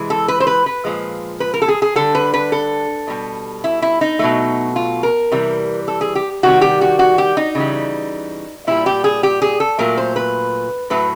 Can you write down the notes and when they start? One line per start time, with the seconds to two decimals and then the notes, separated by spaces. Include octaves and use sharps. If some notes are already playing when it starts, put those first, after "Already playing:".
Already playing: C3 E3 G#3
0.10 A4
0.28 B4
0.40 C5
0.47 B4
0.66 B4
0.85 A#2 F3 G#3
1.40 B4
1.54 A#4
1.62 A4
1.68 G#4
1.82 G#4
1.96 D3 G3 A4
2.15 B4
2.34 B4
2.52 A4
3.08 B2 G3
3.64 E4
3.82 E4
4.01 D#4
4.19 B2 F#3 A3
4.76 F4
5.03 A#4
5.32 C3 E3 G3
5.88 A4
6.01 G#4
6.15 G4
6.43 C3 D#3 G3 F#4
6.61 G4
6.81 F#4
6.99 F#4
7.18 G4
7.37 D#4
7.55 C#3 E3 G3
8.67 A#2 G3 E4
8.86 G4
9.04 G#4
9.23 G4
9.42 G#4
9.60 A4
9.79 A#2 F#3 A3 A#4
9.97 C5
10.16 B4
10.90 A2 F#3 A3 B4